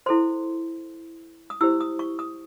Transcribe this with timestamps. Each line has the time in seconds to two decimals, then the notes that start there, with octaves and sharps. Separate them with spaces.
0.06 E4 A4 C5 C6
1.50 D#6
1.61 E4 G4 C5 E6
1.81 D#6
1.99 C#6
2.19 D#6